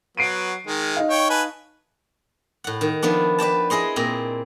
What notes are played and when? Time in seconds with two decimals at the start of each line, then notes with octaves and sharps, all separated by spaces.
0.17 F#3 B3 C7 D7 D#7
0.67 D#3 G#3
0.96 D#4 D#5 F5
1.10 C#5 G5
1.30 B4 G#5 A5
2.64 A2 F#5
2.81 D#3
3.02 D#3 F3 B3 D4
3.38 B4 D5 G5 A5
3.70 E4 G#4 D#5 C6
3.96 A#2 C4 A#5